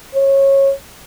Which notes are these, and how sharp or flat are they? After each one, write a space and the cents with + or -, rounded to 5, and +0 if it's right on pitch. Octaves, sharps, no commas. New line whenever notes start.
C#5 -20